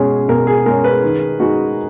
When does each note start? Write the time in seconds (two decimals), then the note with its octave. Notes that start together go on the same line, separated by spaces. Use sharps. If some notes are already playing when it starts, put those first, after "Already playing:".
Already playing: B2 G#3 C#4 G#4
0.28 B2 A#4
0.47 G#4
0.66 G#3 C#4 A#4
0.84 B4
1.03 D#3
1.40 G#3 D#4 F#4